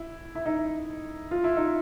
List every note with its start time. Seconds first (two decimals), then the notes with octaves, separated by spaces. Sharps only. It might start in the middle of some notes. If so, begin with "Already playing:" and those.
Already playing: E4
0.35 E4
0.46 D#4
1.31 F4
1.44 E4
1.57 D#4